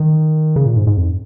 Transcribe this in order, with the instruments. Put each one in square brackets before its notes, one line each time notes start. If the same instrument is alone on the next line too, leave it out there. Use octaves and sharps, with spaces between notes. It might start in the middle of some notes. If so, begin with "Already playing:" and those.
Already playing: [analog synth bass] D#3
C#3
A#2
G#2
G#2
F2